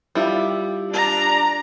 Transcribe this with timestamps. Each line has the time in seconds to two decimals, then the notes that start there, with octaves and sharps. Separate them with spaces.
0.15 G3 E4 F4
0.91 D4 A#5